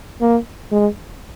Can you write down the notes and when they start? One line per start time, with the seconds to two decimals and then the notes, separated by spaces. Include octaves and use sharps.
0.21 A#3
0.72 G#3